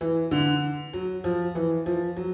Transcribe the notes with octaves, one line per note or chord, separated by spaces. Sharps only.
E3
D3
F#3
F3
E3
F3
F#3